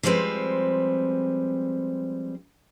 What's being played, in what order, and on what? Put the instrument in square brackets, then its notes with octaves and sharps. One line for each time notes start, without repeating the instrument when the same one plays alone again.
[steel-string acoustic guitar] D3 F3 G3 G#3 C4 B4